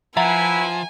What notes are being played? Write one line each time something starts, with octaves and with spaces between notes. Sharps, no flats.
F3 E4 B4 E5 F#5 G#5 A#5